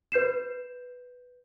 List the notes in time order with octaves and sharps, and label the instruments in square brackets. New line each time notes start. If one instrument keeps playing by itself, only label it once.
[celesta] B4 G6 C7 E7